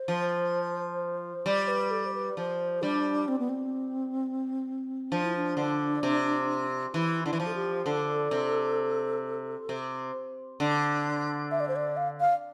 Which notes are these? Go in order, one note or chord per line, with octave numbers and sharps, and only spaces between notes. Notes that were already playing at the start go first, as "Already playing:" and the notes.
Already playing: C5
F3
G3 D5
B4
A4
C5
B4
F3 C5
G3 D4
C4
B3
C4
F3 D4
E4
D4
D3
C3
E3 E4
D3 E4
E3
F3
A4
G4
D3 A4
C3
C3
D3
E5
D5
C5
D5
F5
F5